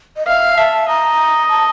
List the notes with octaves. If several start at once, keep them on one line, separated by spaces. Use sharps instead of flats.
D#5
E5 F5
E5 A5
D#5 A#5
A5